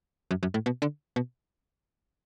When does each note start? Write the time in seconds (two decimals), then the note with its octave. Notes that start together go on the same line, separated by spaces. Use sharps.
0.31 F#2
0.43 F#2
0.54 A2
0.66 B2
0.82 D3
1.16 B2